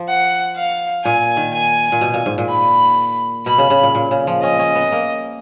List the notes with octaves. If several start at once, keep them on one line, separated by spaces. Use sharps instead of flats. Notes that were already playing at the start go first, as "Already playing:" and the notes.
Already playing: F3
F#5
F5
A#2 G#5
D#3
G#5
A#2
B2
A#2
G#2
A#2
B5
B2 B5
C#3
C#3
A#2
A#2
C#3
F3
C#4 D#5
C#4
B3
A#3